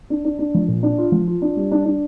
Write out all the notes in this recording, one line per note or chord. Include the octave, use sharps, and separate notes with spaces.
D4
D4
D4
F3
A#2
D4
F4
F3
F4
D4
G3
D4
D4